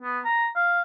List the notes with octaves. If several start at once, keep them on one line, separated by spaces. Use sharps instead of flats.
B3
A#5
F5